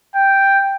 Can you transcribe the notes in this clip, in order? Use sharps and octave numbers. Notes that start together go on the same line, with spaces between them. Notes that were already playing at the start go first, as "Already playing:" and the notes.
G5